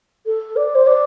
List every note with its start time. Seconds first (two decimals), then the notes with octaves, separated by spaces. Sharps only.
0.26 A4
0.56 D5
0.75 C5
0.86 D5